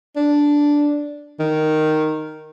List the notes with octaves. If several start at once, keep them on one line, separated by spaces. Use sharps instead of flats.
D4
D#3